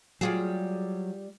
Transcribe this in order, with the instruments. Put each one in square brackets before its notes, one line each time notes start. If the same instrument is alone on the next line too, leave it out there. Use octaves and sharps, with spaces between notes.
[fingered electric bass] F#3 [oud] G3 F4 G#4